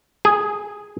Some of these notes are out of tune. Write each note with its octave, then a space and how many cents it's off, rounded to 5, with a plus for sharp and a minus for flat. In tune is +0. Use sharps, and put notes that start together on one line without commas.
G#4 +0 G#5 -25